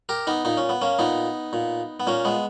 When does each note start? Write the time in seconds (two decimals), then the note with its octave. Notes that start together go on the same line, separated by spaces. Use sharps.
0.09 G4 A#4
0.27 B3 D#4
0.45 A#2 D#4
0.57 C#4
0.69 B3
0.81 A#3 C#4
0.99 A#2 B3 D#4
1.53 A#2
2.00 B3
2.07 A#2 A#3 C#4
2.25 G#3 B3